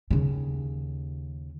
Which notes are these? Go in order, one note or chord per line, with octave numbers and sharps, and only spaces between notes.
D#2 C#3